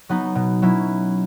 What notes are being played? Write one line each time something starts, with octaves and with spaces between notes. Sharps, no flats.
F#3 B3 D#4
B2
F#3 C#4 E4